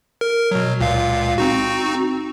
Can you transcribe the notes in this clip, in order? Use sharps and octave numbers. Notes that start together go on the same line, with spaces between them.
A#4
B2 F#3
C#2 A#2 F5
C4 D#4 F#4